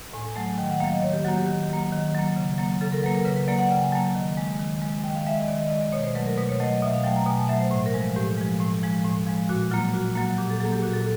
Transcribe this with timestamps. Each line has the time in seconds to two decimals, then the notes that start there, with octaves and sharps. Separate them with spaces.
0.13 A2 G#5
0.35 F#3 A3 G#5
0.58 D#3 G5
0.70 F#5
0.80 F#3 A#3 F5
0.92 D#5
1.02 D#3 C#5
1.13 G4
1.25 F#3 A#3 F#4
1.36 G4
1.47 D#3 G4
1.70 F#3 A#3
1.92 D#3
2.15 F#3 A#3
2.36 C#3
2.58 F#3 A#3
2.81 C#3 A4
2.92 A#4
3.03 F#3 A#3 B4
3.15 A#4
3.25 C#3 B4
3.36 B4
3.48 F#3 A#3 D5
3.59 F#5
3.70 C#3 G5
3.81 G#5
3.92 F#3 A#3 A5
4.15 D#3
4.37 G#3
4.59 D#3
4.82 G#3
5.04 D#3 G5
5.15 F5
5.26 G#3 E5
5.37 D#5
5.48 D#3 D5
5.59 D#5
5.70 G#3 D#5
5.81 D5
5.92 B2 C#5
6.04 C5
6.15 F#3 A3 B4
6.26 A#4
6.37 B2 B4
6.49 C#5
6.60 F#3 A3 D#5
6.71 D#5
6.82 B2 E5
6.94 F5
7.04 F#3 A3 G5
7.16 A#5
7.26 B2 G#5
7.38 A5
7.48 F#3 A3 E5
7.60 C5
7.71 A2 C5
7.86 A#4
7.94 F3 G#3
8.16 A2 G4
8.38 F3 G#3
8.60 A2
8.83 F3 G#3
9.05 A2
9.26 F3 G#3
9.49 A#2 F#4
9.71 F#3 A#3 F4
9.94 A#2 F#4
10.15 F#3 A#3 F#4
10.38 A#2 G4
10.50 A4
10.60 F#3 A#3 G#4
10.72 G4
10.82 A#2 F#4
10.93 A4